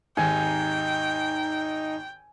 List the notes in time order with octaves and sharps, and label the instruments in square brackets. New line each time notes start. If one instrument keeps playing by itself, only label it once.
[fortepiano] G#1 D#2 G#2 [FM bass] D#4 [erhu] G5 [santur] G#5